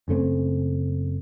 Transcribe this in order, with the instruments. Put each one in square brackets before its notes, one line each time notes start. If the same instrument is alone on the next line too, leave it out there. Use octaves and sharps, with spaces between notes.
[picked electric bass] F#1 C#3 A3 C4